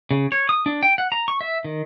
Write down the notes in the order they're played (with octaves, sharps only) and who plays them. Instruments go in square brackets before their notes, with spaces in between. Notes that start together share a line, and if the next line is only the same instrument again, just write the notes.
[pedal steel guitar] C#3
C#5
D#6
D4
G5
F#5
A#5
C#6
E5
D#3